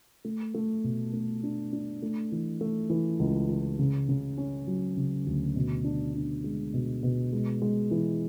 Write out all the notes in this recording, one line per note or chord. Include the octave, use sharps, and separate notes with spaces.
A3
A3
B2
A3
D4
D4
A3
E3
A3
E3
C#2
E3
C#3
C#3
C#4
F#3
C#3
D2
B2
D4
D4
G#3
B2
B2
G#3
G#3
E3